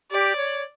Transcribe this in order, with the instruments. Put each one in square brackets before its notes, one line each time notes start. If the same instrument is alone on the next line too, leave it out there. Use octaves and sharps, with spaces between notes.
[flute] G4 [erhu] D5
[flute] C#5